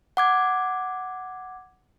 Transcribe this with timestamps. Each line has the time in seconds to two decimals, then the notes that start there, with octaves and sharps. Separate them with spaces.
0.17 F#5 D6 G#6